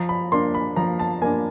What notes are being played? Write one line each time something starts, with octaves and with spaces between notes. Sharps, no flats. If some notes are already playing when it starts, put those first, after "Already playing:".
Already playing: F3 A#5
B5
A#3 D4 C6
B5
F3 A#5
A5
A#3 D4 G#5